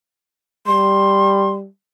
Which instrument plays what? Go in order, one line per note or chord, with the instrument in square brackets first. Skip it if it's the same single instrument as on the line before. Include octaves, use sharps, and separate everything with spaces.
[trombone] G3 [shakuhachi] C6